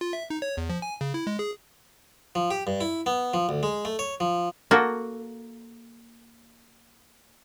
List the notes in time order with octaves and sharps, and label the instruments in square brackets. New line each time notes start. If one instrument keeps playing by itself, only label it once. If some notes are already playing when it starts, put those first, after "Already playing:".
[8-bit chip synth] F4
E5
D#4
C#5
E2
F3
G#5
C#3
E4
G#3
G#4
[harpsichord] F3
G4
G2
E4
B3
F3
D2
G#3
A3
C#5
F3
[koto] A#3 F#4 A4